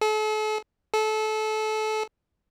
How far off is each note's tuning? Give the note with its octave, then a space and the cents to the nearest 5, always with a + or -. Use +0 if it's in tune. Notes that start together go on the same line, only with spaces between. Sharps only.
A4 -40
A4 -25